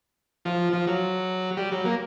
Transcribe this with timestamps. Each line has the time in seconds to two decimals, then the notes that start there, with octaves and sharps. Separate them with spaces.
0.45 F3
0.73 F3
0.87 F#3
1.57 G3
1.72 F#3
1.85 A#3